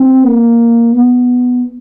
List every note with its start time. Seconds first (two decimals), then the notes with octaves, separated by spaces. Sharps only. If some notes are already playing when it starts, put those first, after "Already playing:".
Already playing: C4
0.25 A#3
0.93 B3